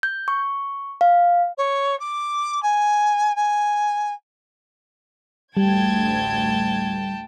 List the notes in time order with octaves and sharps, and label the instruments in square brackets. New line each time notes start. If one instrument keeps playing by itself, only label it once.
[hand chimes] G6
C#6
F5
[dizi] C#5
D6
G#5
G#5
[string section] A1 D2 G#6 [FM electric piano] G3 [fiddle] G5 A5